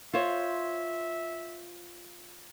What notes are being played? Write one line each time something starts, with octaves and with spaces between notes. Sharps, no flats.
F4 C5 C#5 E5